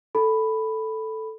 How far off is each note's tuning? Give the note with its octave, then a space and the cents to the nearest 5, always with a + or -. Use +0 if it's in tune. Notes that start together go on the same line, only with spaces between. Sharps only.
A4 +0 B5 +0